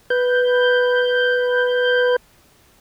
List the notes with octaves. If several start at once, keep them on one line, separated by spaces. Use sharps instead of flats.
B4 G6